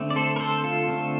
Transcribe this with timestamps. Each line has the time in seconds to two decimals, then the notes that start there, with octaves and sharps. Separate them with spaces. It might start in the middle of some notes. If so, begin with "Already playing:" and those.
Already playing: D3 A3 C4
0.10 D5
0.16 A4 C5
0.36 A#4
0.40 A4 C5
0.64 F4 A4
0.88 D3 A3 C4